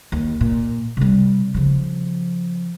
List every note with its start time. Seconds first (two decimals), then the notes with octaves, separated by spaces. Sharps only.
0.12 D#2
0.41 A#2
0.97 C3 G3
1.54 C#3 F3